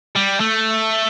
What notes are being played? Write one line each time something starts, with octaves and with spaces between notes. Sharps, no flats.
G3
A3